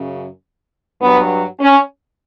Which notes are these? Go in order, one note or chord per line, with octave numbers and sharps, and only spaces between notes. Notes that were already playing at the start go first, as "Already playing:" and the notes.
Already playing: F#2 C#3
G2 F#3 B3
C#4